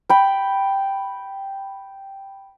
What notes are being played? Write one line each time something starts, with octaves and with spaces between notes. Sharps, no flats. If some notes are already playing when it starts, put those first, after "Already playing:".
G5 B5